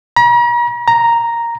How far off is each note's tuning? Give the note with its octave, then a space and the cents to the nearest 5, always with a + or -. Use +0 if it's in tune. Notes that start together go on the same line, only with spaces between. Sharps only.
A#5 +45
A#5 +0